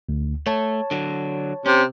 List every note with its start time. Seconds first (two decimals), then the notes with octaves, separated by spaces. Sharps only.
0.09 D2
0.46 A3 C#5 A5
0.91 D3 F#3
1.66 C3 C#4